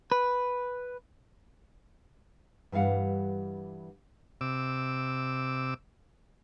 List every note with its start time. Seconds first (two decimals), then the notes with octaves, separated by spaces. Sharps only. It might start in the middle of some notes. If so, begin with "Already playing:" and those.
0.12 B4
2.72 G2 E3 G3 F5 F#5
4.41 C3 D6 E6